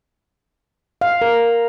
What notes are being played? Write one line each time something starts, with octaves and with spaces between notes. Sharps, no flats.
F5
A#4